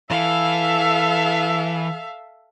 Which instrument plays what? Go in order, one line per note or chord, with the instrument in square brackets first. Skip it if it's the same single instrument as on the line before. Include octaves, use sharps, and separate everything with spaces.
[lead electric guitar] E3 [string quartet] A4 E5 F5